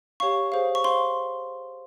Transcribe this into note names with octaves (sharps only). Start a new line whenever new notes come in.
G4 C#5 F5 C#6
G#4 C5 F5
C#6
C5 F5 C6